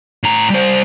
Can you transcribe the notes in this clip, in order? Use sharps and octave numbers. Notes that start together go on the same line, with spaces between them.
A2 A#5
G3 C5